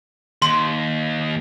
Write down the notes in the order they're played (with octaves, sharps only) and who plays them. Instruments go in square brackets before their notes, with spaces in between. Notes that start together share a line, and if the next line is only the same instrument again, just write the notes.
[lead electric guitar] D#2 [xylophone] C6